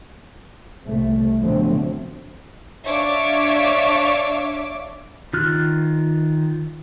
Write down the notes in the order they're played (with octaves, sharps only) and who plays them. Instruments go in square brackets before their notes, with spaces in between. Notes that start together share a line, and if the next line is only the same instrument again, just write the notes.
[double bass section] C2 C3 A3
B2 D3 F3 F#3 A3 C4
[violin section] D4 C#5 E5 F5 D6
[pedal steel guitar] D#3 F4 F6 F#6